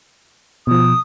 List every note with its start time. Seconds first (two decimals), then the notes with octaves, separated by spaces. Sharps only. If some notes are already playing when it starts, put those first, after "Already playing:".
0.67 B2 F3 D#6